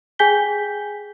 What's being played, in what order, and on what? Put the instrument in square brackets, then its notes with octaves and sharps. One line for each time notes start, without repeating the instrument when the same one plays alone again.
[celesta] G#4 G5 G#5 G6 B6 G7